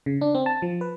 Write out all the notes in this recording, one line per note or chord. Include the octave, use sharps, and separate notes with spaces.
C#3
D4
C4
A5
F3
B4